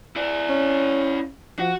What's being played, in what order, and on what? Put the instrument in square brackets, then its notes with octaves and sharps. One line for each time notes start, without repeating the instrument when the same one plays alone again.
[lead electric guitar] E4 D5
[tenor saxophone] C#4
[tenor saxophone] F3 [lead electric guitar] F#4